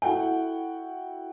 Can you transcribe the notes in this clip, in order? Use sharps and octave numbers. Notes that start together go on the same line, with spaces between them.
E4 F#4 A4 F#5 G5